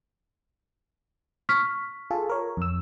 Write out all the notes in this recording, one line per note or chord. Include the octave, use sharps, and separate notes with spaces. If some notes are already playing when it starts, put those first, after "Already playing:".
C#6 F6 B6
F4 G#4 A4
A#4 C#5
F2 E6